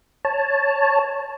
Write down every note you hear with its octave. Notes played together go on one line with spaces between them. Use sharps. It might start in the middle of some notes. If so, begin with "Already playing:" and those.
C#5 A5